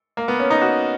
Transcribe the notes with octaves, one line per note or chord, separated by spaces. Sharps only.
A#3
B3
C#4
D#4
F#4